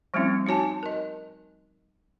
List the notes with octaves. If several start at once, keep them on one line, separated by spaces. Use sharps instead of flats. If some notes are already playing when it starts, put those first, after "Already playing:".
F3 G3 A3 C4 C#4 E4
D#4 F#4 C#5 G#5 A5
A#4 D#5